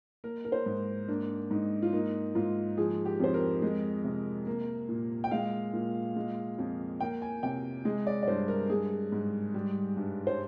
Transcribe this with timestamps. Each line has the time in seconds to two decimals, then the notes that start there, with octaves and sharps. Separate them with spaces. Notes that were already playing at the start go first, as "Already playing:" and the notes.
0.24 A#3 A#4
0.45 A#4
0.52 C5
0.66 G#2
1.08 A#3 D4
1.51 G#2 D#4
1.82 F4
1.93 A#3 D#4
2.35 G#2 F4
2.77 F3 G#4
3.05 G4
3.20 F2 C5
3.34 A#4
3.62 G#3
4.04 C3
4.47 A#3
4.89 A#2
5.24 G5
5.31 G#3 F5
5.73 A#2
6.16 G#3
6.58 F2
7.00 A#3 G5
7.22 G#5
7.43 C3 G5
7.85 G#3 G#4
8.07 D5
8.23 D5
8.27 G2 C5
8.48 A#4
8.70 G#3 G#4
9.12 G#2
9.54 G3
9.97 G2
10.27 C5